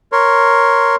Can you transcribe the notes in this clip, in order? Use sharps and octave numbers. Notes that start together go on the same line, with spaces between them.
A#4 C#5 C6